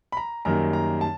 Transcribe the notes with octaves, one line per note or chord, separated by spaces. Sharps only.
B5
A#5
F#2 D#3 G3 A#3 A#5
A#5
A5